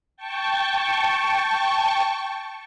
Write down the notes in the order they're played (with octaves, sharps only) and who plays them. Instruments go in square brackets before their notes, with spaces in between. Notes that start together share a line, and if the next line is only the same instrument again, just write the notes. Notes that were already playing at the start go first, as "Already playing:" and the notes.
[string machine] G5 A5 C#6